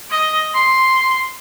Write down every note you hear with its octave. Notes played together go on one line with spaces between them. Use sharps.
D#5
C6